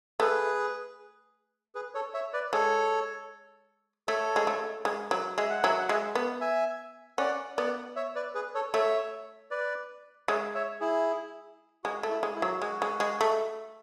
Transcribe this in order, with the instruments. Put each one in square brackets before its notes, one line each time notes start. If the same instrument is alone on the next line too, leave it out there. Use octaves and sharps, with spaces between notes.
[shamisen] A3 [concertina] G#4 B4
[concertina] G#4 B4
A4 C#5
C#5 E5
B4 D5
[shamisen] G#3 [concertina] A4 C#5
[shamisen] A3 [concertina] A4 C#5
[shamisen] G#3
A3
G#3
F#3
[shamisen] G#3 [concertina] E5
[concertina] F#5
[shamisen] F#3 [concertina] E5 G#5
[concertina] F#5
[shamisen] G#3 [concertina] E5 G#5
[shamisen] B3
[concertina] E5 G#5
[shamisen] C#4 [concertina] D5 F#5
[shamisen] B3 [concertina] D5 F#5
[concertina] C#5 E5
B4 D5
G#4 B4
A4 C#5
[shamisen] A3 [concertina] C#5 E5
[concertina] B4 D5
[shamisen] G#3 [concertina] C#5 E5
[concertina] C#5 E5
E4 G#4
[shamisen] G#3 [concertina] F#4
[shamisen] A3
[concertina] E4
[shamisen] G#3
[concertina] E4
[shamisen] F#3
[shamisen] G#3 [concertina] F#4
[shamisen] G#3
G#3
A3